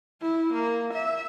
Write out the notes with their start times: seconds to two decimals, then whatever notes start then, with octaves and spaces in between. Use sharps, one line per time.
0.21 E4
0.53 A#3
0.93 E5